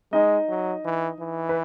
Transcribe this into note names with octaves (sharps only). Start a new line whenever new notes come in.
G#3 D#4 D#5
F#3
E3
E3
B4